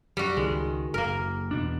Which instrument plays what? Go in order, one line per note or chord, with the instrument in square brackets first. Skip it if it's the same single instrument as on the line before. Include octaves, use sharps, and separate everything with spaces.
[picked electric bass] F#2 [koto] G3 F#4
[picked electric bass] C#2 D#3 [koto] G#3
[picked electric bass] F#1 [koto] A#3 A#4
[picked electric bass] E2 B2 D4